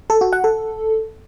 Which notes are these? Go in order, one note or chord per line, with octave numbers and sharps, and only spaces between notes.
A4
F#4
F#5
A4